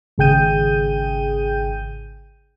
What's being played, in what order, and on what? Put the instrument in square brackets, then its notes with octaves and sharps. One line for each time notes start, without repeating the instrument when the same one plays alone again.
[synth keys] G#1 C#3 G#4 G5 G6 D#7